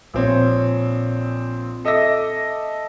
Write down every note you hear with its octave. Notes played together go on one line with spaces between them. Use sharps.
A#1 C4 C#5
A4 D#5 E5 D6 E6 A#6